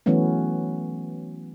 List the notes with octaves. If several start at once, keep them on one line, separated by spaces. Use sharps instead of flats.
E3 F#3 A3 B3 C#4